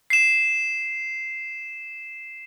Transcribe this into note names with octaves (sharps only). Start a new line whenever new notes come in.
C7 E7